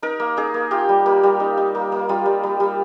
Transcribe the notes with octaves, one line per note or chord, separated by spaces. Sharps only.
D#4 A#4
A#3
D#4 G#4
A#3
F4 G4
G3
A#3
G3
D#4
D#4
A#3
A#3
G3 F4
G3
G3
G3